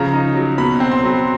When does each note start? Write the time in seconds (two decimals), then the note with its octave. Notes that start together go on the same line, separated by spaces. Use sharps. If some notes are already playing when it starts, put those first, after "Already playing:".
Already playing: C#3 F3 A#5
0.13 D#4
0.35 F#3
0.58 B2 B5
0.80 C4
0.92 C6
1.03 F#3